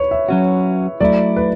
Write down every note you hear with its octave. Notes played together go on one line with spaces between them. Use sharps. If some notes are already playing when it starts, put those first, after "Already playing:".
Already playing: B4 C#5
E5
F#3 C#4 F#4
F#3 A3 E4 D5
B4